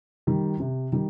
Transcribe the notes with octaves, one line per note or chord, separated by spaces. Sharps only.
D#3 G3
C3
D#3 G3